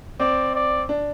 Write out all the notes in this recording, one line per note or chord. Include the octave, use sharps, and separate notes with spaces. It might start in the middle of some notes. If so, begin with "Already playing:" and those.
C4 D5
D5
D4